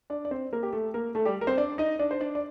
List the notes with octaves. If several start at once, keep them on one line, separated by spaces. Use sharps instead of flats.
D4 D5
D5
C4 C5
A#3 A#4
G4
A3 A4
A#3 A#4
A3 A4
G3 G4
A#4
C4 C5
D4 D5
D#4 D#5
D4 D5
C5
D4 D5
D5